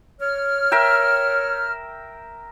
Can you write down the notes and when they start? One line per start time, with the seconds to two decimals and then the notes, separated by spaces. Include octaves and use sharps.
0.20 C#5 F6
0.72 A#4 E5 G5